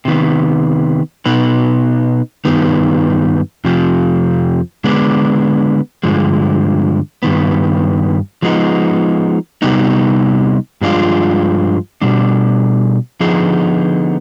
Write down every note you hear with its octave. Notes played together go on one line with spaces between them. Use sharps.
C3 D#3 B3
B2 B3 D#4 B4
G2 D#3 B3 D#4 B4
F2 C3 F3
D3 G#3 B3 D4
G2 D3 F3 G#3
G2 D#3 B3
F3 G#3 B3 D#4
C3 G3 B3 D#4
G2 F3 G#3 D4 F4
B2 G3 D4
D3 F3 B3 D#4 G#4